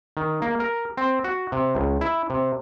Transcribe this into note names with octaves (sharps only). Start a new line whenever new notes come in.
D#3
A#3
A#4
C4
F#4
C3
C#2
E4
C3